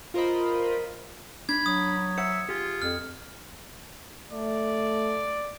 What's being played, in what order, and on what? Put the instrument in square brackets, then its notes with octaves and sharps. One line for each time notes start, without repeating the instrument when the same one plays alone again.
[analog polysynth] F4 A#4 C5 D#5 B5
[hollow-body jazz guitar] D4 [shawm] B5 [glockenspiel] G#6
[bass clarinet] F#3 [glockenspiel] D#6
[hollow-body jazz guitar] C5 F#5 [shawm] E5 [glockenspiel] C#7
[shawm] F4 [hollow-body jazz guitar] G4 G#4
[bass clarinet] F2 [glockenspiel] F6
[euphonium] A3 [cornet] D5